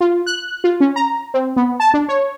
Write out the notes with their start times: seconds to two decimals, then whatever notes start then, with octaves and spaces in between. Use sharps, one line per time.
0.01 F4
0.26 F#6
0.64 F4
0.80 C#4
0.96 A#5
1.34 C4
1.56 B3
1.80 A5
1.94 D4
2.09 C#5